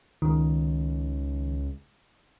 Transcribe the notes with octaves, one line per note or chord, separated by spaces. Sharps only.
C#2 D#3